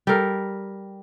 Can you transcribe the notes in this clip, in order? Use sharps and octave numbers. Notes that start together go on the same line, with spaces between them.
G3 A4 A#4